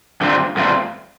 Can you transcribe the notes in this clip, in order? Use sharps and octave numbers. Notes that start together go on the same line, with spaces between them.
G2 D3 A3 C4 F4
G2 D3 A3 C4 F4